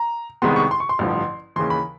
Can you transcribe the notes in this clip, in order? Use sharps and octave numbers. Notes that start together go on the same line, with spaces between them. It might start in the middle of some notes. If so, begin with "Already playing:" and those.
Already playing: A#5
C2 C3 D#3 G#3 B3 C6
C#6
C6
C#6
C6
A1 G2 D3 F3
D#2 C#3 E3 C6
B5